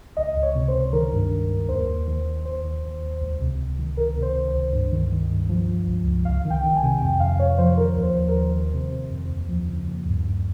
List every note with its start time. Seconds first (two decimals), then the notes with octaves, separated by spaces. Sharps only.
0.17 C#2 D#5
0.36 C#2
0.43 C#5
0.55 C3
0.68 C5
0.74 C#2
0.93 D#3 A#4
1.12 G2
1.31 G2
1.50 G2
1.69 D#2 C5
1.88 D#2
2.07 D#3
2.26 D#3
2.45 D#2 C5
2.64 D#3
2.83 D#2
3.02 D#2
3.21 C#2
3.40 C3
3.59 C#2
3.79 D#3
3.97 C#2 A#4
4.16 C3
4.22 C5
4.35 C#2
4.48 C5
4.54 C#2
4.73 G2
4.92 D#3
5.12 D#3
5.31 G2
5.49 F3
5.69 F3
5.87 C#2
6.06 C#2
6.25 C2 F5
6.45 D#3
6.50 G5
6.64 D#3
6.76 G#5
6.82 C3
7.02 F2 G5
7.20 F2 F5
7.39 F2 C#5
7.58 F3 C5
7.77 D#3 A#4
7.96 D#2
8.03 C5
8.15 D#2
8.28 A#4
8.35 D#3
8.53 D#3 C5
8.73 C3
8.92 C3
9.10 F2
9.29 D#2
9.49 F3
9.67 C#3
9.87 D#2
10.06 G2
10.25 G2